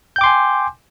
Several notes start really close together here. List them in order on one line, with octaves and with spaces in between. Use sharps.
G6 G5 D6 C6 G#5